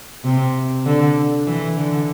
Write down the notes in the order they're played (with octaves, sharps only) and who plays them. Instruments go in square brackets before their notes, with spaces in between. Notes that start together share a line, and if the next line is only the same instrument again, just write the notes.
[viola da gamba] C3
D3
E3
D3